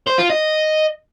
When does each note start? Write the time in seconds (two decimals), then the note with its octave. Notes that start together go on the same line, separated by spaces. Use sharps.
0.08 C5
0.19 F4
0.30 D#5